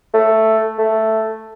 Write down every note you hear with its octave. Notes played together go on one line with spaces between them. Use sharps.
A3
A3